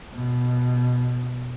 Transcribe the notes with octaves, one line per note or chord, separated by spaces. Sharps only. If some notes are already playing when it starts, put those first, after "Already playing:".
B2